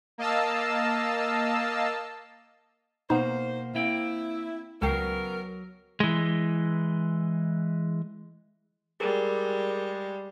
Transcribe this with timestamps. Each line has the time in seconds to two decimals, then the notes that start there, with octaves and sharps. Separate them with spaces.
0.18 A#3 D#5 F5 A5 E6
3.10 B2 A#3 B3 D#4 C5
3.75 A#3 C4 E4 G5
4.82 C#2 C#3 F#3 B3 A#4 G5 C7
6.00 E3 G#3
9.00 G3 G#3 G#4 A#4